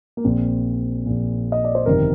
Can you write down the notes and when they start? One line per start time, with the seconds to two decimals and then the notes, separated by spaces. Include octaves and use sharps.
0.17 A#3
0.24 A#1 A#2 C4
1.06 A#1 A#2
1.52 D#5
1.64 D5
1.75 C5
1.86 G1 F2 C3 D#3 A#4